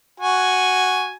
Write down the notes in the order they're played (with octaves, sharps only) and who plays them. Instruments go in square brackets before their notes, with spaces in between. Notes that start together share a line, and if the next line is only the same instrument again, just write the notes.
[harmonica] F#4 G#5